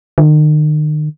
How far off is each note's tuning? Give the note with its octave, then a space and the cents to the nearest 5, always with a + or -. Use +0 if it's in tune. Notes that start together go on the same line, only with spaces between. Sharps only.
D#3 -40